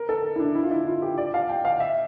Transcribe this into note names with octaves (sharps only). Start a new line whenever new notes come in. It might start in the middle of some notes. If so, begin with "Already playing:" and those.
Already playing: A#4
A4
E4
D4
E4
F4
E4
F4
G4
D5
F5
G5
F5
E5